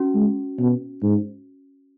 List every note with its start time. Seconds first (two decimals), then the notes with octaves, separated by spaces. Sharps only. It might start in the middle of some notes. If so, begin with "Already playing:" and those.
Already playing: C#4 F#4
0.14 G#3
0.59 B2
1.03 G#2